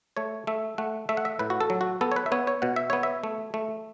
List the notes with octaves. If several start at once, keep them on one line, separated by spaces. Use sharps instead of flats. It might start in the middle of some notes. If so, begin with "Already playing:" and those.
A3 C#5
A3 E5
A3 F#5
A3 E5
F#5
E5
A2 B4
F#4
A4
F#3
F#4
B3 A4
C#5
B4
E5
B3 C#5
C#5
B2 F#5
E5
B3 C#5
E5
A3
A3